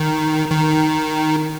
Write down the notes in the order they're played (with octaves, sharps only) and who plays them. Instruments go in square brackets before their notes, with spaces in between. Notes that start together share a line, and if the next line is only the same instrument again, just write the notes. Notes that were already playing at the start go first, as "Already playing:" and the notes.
Already playing: [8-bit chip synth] D#3
D#3